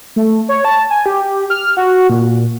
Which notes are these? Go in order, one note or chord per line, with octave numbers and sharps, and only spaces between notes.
A3
C#5
A5
G#5
G4
F6
F#4
A#2